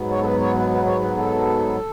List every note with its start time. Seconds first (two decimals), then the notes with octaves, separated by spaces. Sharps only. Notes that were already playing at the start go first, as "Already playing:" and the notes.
Already playing: G#2 F#3 B3
0.10 C#5
0.20 A4
0.25 B4
0.41 C#5
0.55 B4
0.70 B4
0.86 C#5
1.01 B4
1.17 A4